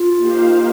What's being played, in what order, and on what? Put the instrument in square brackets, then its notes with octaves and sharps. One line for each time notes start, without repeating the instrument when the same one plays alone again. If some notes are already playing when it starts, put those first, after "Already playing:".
Already playing: [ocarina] F4
[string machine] A#3 D#4 G4 C5 F5